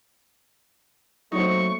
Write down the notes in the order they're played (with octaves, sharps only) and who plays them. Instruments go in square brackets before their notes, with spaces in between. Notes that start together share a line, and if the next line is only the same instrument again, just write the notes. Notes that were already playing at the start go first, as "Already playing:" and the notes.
[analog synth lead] F#3 [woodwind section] A3 A#3 [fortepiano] C4 D#4 [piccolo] C#6